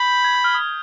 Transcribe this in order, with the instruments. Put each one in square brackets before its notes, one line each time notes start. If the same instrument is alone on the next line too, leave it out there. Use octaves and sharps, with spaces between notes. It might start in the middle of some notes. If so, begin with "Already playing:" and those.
Already playing: [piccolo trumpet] B5 [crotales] G6
[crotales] G#6
G6
F6
D#6